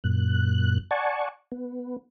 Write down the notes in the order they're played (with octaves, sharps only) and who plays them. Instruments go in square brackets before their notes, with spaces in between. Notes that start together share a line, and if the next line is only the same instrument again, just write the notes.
[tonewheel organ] F#2 A#2 F#6
D5 F#5 G#5 A5 C#6
B3